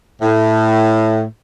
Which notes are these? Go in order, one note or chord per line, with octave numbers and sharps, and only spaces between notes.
A2